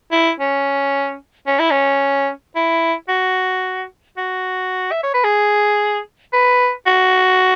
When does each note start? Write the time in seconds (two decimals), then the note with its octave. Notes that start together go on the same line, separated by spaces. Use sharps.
0.12 E4
0.40 C#4
1.47 C#4
1.59 E4
1.71 C#4
2.56 E4
3.09 F#4
4.17 F#4
4.92 E5
5.03 C#5
5.14 B4
5.24 G#4
6.33 B4
6.86 F#4